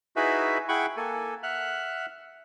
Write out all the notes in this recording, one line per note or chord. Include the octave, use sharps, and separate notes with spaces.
D#4 E4 F#4 G#4 B4 E5
E4 G#4 F#5 G5 B5 C#6
A#3 A4 G#5
E5 F#5 F6 F#6